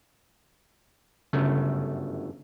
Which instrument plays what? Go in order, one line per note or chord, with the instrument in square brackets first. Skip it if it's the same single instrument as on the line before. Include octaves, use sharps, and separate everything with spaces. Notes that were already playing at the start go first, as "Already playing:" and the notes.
[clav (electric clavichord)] G1 F#2 A3 [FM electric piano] C#3